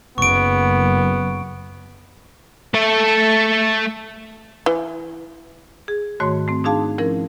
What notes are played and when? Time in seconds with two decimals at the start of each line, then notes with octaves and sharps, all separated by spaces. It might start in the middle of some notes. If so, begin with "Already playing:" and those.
0.18 F#1 B3 C#6 D7
2.74 A3 A4
4.66 E3
5.88 G#4
6.20 G#2 D#3 A3 F#4 C#5 C6
6.48 A3 C4
6.64 D4 D#4 G#4 F5 A5
6.98 F3 C#4 E4 A#4